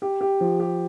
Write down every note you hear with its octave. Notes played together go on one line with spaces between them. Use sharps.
G4
G4
F3
G4